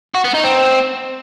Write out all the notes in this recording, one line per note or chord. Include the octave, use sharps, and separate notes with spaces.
F#4
B3
D#4
C4